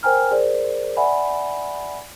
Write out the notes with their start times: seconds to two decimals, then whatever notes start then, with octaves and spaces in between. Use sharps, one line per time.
0.03 A#4 C5 G5 G#5 A#5 F6
0.31 G#4 A#4 C5 D5
0.97 D5 E5 F#5 G#5 B5